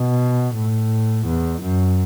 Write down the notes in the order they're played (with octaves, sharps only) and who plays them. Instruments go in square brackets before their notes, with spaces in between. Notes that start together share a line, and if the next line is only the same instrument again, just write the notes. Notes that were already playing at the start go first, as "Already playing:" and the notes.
Already playing: [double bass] B2
A2
E2
F#2